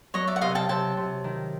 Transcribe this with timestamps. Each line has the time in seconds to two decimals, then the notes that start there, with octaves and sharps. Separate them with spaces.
0.14 F#3 C#5 D#5
0.27 D5 E5
0.36 F#5
0.41 C3 D#5 F5
0.55 G5 A5
0.69 C3 G5 A5
0.97 C3
1.24 D#3